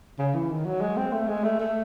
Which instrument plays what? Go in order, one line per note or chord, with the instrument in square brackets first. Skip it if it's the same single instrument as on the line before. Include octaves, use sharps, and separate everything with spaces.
[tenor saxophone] C#3
E3
D#3
F#3
G#3
C4
A3
G#3
A3
A3